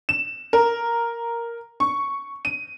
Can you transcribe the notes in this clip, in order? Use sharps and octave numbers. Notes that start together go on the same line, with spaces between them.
E7
A#4
C#6
D#7